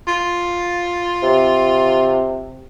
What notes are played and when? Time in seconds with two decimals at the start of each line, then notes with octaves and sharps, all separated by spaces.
0.07 F4
1.23 C3